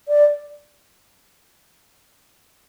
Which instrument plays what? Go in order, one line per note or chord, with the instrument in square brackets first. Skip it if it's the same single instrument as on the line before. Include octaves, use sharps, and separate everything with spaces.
[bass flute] D5